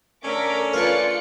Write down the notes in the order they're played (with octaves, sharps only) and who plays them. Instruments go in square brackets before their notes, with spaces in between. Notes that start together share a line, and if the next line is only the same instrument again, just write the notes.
[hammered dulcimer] D3 A3 [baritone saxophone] C#4 [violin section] A#4 D6 B6
[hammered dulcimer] A3 [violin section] F4 D5 C#7 [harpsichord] A#4 B4